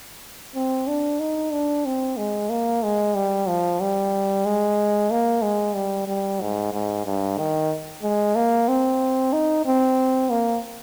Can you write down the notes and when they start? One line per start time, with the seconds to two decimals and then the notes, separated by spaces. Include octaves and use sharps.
0.56 C4
0.88 D4
1.20 D#4
1.53 D4
1.86 C4
2.17 G#3
2.50 A#3
2.83 G#3
3.15 G3
3.47 F3
3.81 G3
4.46 G#3
5.11 A#3
5.42 G#3
5.75 G3
6.08 G3
6.41 G#2
6.73 G#2
7.06 G2
7.38 D#3
8.03 G#3
8.35 A#3
8.68 C4
9.33 D#4
9.66 C4
10.30 A#3